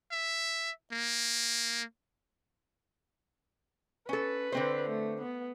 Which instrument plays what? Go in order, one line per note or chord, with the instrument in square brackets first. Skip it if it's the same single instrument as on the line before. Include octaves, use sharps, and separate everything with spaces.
[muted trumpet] E5
A#3
[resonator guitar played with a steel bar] C#4 A4 [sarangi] B4
[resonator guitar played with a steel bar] D3 C4 C5
[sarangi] A3
B3